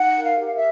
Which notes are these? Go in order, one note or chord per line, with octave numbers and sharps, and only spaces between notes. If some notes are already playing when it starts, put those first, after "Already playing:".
Already playing: D#4 F#5
A#4
F5
G4
F5
E5